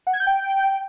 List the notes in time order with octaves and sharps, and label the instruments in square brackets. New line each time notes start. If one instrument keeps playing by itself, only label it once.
[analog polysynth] F#5
G#6
G6
G5